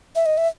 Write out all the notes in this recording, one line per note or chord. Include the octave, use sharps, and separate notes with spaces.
E5
D#5
E5